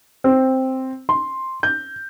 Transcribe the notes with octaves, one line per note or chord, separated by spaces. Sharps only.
C4
C6
G6